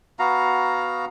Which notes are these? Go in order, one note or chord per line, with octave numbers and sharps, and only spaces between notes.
B3 F#4 F5 A#5